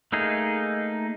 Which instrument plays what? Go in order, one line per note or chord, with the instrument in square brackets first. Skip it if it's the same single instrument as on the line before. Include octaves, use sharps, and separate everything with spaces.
[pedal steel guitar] A3 A#3 D#4 G#4